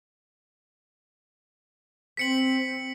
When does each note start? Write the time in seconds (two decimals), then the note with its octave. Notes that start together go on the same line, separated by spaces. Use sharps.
2.17 C4 B6 C#7 F#7